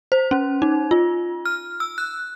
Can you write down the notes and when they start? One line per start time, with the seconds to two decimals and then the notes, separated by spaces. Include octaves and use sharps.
0.12 C5
0.31 C#4
0.62 D#4
0.91 F4
1.45 F6
1.80 E6
1.98 F#6